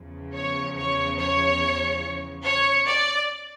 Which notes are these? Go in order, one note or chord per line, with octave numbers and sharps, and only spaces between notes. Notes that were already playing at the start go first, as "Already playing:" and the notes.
Already playing: E2 C#3 F3
C#5
C#5
C#5
C#5
D5